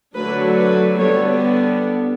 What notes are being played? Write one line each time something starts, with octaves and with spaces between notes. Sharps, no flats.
D3 F#3 A3 D4 B4
B4
D3 G3 B3 D4 C#5